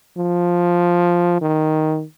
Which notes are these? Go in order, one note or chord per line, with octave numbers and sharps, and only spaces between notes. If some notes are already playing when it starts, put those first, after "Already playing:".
F3
D#3